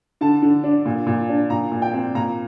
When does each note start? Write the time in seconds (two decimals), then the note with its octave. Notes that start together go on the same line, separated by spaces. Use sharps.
0.21 D3 A5
0.42 D3
0.63 D4
0.85 A#2
1.07 A#2
1.29 D4
1.50 A#2 A#5
1.72 A#2
1.82 G5
1.93 C4
2.15 A#2 A#5